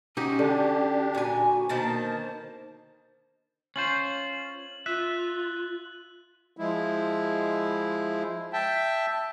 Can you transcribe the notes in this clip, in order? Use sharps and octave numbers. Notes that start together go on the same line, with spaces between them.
C#4 D#4 F#4 G4
D3 D4 G4
A#2 F#4 G#5
B2 D#3 A#3 C5 A5
C#4 F4 C5 F#7
F4 E5 F#6
F3 G#3 E4
E5 G5 A5